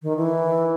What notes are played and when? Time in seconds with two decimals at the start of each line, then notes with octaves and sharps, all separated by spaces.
0.02 D#3
0.17 E3